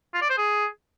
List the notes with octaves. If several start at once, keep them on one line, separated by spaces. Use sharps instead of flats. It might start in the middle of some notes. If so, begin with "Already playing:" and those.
F4
D5
C5
G#4